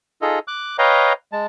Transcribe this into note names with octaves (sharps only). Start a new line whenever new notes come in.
D#4 F4 G#4 A4 D#5
D6 F#6
B4 C#5 D#5 F5 G5 A#5
G#3 A5